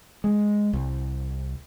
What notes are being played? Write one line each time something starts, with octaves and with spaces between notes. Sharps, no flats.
G#3
C2